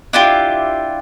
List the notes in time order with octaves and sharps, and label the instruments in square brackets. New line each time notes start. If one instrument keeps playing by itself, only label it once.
[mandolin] D4 E4 F4 G4